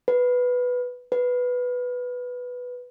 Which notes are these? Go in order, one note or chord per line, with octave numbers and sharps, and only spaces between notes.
B4
B4